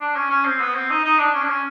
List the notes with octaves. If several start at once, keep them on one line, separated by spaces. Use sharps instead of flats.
D4
C#4
C#4
C4
B3
C4
D#4
D#4
D4
C#4
D4
C#4